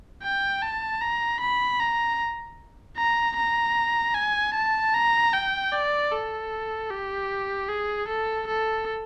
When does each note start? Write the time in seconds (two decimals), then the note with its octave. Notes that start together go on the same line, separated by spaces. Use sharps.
0.23 G5
0.62 A5
1.01 A#5
1.41 B5
1.80 A#5
2.98 A#5
3.37 A#5
4.15 G#5
4.54 A5
4.94 A#5
5.33 G5
5.72 D5
6.11 A4
6.90 G4
7.69 G#4
8.08 A4
8.47 A4